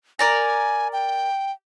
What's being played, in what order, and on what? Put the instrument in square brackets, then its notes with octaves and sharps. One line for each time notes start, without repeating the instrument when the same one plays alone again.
[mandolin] A#4 D5 A#5 [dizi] G#5
[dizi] G5